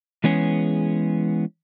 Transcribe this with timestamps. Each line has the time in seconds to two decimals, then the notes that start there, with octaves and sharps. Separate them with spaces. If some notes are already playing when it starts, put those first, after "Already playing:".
0.24 E3 G#3 B3 C#4 G#4